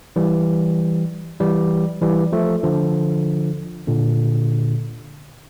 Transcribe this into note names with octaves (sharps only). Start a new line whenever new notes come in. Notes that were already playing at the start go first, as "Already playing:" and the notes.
E3 G3
E3 G3
E3 G3
F3 A3
D3 F3
A#2 D3